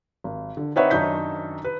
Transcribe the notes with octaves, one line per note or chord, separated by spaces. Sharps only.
G#1
D3
C4 D#4 B4 C#5 E5 F#5
F#2 D#3 D4 D#4 G6 B6
B4